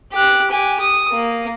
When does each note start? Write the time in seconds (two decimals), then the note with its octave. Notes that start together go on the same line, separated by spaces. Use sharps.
0.13 G4 F#6
0.51 G4 G#5
0.80 D#6
1.12 A#3